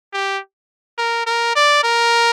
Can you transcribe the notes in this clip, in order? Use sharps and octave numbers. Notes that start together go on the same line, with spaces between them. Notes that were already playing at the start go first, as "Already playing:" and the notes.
G4
A#4
A#4
D5
A#4